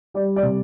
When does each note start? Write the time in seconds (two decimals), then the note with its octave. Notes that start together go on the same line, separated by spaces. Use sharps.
0.14 G3 D5
0.36 D5
0.43 C3